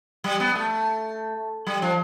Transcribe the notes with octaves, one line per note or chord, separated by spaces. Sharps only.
G3
B3
A3
G3
F3